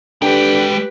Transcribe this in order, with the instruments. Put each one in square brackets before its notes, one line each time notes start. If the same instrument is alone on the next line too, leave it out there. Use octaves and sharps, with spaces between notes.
[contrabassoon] D3 [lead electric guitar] G#3 G5 [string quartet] G4 B4